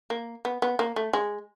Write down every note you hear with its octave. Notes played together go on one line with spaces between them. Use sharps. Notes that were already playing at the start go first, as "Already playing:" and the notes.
A#3
B3
B3
A#3
A3
G#3